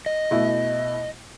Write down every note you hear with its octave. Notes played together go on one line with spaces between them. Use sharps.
D#5
B2 A3 E4